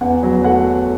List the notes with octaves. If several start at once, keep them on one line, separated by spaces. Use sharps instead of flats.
E2 F#5
F#3
A3 F#5